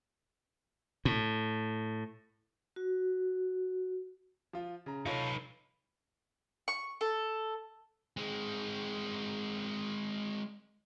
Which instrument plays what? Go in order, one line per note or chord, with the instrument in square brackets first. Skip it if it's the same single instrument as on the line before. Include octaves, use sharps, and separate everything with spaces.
[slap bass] A2
[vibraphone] F#4
[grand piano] F3 F4
C#3 A#5
[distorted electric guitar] D#4 B4 [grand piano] F4 A4 C#5
[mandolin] C#6
A4
[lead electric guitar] G#3 C4